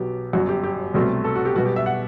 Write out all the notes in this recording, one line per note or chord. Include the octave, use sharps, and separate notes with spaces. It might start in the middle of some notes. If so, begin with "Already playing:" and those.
Already playing: B1 B2 F#3 B3 G4
G1 F#2 F#3 F#4
G4
G4
C2 B2 F#3 A3 C4
A4
F#4
G4
B1 B2 G3 B3 F#4
G4
E5
F#5